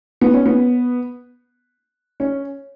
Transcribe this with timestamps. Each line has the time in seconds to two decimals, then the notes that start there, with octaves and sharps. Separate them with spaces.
0.21 B3
0.34 C#4
0.46 B3
2.20 C#4